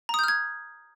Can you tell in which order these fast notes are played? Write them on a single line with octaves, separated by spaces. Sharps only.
A#5 D#6 G6 F6 G#6